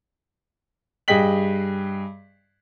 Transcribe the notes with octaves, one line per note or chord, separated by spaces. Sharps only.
G2 G#4 D#5 G5 B6 F#7